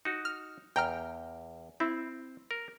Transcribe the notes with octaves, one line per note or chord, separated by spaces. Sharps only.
D#4 F#4
F6
E2 G5 A#5 F6
C4 E4
A#4